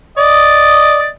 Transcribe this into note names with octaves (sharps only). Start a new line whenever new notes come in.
D5 D#5